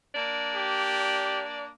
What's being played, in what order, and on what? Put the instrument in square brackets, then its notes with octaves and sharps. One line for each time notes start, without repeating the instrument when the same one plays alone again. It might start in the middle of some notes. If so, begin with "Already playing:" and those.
[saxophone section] A#3 D4 D5
[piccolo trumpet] G4